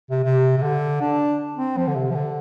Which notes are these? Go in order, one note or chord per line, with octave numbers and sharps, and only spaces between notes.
C3
C3
C3
D3
D4
C4
F3
D3
C3
F3
D3